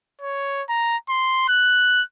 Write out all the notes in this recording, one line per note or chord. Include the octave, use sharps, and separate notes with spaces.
C#5
A#5
C6
F#6